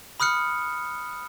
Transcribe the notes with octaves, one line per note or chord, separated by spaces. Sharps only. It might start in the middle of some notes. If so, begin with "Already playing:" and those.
B5 D#6 F6 F#6 C#7